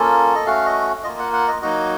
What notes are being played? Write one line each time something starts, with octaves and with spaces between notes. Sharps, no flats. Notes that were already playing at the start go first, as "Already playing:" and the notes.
Already playing: A#3 C#4 F4 A4
D#5
A3 C#4 F#4 F5
D#5
A#3 F4 D#5
F#5
F#5
D#5
F#3 A#3 D#4 F#4 D#5